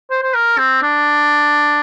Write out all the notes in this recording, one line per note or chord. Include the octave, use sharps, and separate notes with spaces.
C5
C5
A#4
C4
D4